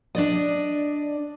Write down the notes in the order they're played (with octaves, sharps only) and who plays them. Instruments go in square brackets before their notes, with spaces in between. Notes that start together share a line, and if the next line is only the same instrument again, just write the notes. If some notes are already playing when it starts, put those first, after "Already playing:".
[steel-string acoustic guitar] D4 D5 D#5